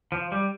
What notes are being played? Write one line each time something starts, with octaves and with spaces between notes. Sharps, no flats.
F3
G3